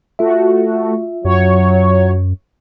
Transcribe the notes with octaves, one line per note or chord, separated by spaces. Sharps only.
A3 F4 F#4 E5
F#2 F#3 C#5